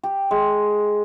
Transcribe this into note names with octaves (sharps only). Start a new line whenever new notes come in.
G4
G#3